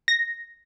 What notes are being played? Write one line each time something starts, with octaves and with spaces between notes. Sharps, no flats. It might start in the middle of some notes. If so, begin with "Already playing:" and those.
A#6